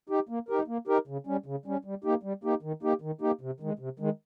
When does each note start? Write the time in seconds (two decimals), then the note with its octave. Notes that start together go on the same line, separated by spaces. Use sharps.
0.09 D#4 G4
0.29 A#3
0.49 D#4 G4 A#4
0.68 A#3
0.87 D#4 G4 A#4
1.07 C#3
1.27 G3 C#4
1.46 C#3
1.65 G3 C#4
1.85 G3
2.04 A#3 D#4 G4
2.23 G3
2.44 A#3 D#4 G4
2.62 D#3
2.82 A#3 D#4 G4
3.01 D#3
3.21 A#3 D#4 G4
3.41 C3
3.60 D#3 G#3
3.79 C3
3.99 D#3 G#3